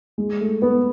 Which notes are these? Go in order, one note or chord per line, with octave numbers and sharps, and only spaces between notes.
G#3
A3
B3